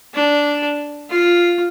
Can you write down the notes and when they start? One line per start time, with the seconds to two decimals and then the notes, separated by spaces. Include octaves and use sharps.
0.14 D4
1.10 F4